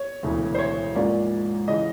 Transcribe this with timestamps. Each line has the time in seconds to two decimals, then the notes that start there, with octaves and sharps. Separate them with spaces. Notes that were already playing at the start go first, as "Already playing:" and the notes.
Already playing: C#5
0.23 E1 D2 C#3 E3
0.54 C5
0.58 C#5
0.95 G#2 F3 A#3 C#4 D5
1.68 C#3 E3 D#5